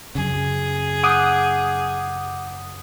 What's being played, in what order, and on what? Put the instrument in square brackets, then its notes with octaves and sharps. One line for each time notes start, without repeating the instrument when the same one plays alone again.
[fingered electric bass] F#2 C#3 [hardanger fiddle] G#4
[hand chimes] F#5 F#6 G6 [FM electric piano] D6 D#6